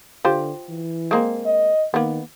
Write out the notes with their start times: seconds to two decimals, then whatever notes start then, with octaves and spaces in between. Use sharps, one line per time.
0.25 D3 F4 G4 C5
0.69 E3
1.11 G#3 A#3 C4
1.46 D#5
1.94 D#3 A#3 B3